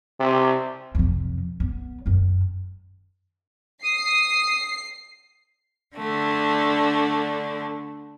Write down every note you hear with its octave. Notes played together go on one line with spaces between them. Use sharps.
C3
F2 C3
B3
F#2 D#3
D#6 C7
D3 A3 D4